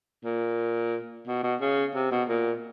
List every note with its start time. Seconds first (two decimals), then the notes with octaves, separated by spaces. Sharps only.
0.24 A#2
1.27 B2
1.43 B2
1.61 C#3
1.95 C3
2.11 B2
2.28 A#2